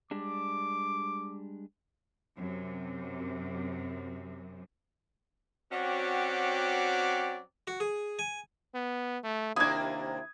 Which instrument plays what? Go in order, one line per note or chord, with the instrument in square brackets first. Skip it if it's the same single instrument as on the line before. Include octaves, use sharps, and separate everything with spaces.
[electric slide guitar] G3 G#3 D4 [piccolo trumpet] D6
[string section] F#2 C3
[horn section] F#3 C4 C#4 F#4 G4 D5
[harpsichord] F#4
G#4
G#5
[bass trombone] B3
A3
[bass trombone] D#2 [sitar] C3 A#3 D4 [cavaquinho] E4 D6 [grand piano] D#6 G#6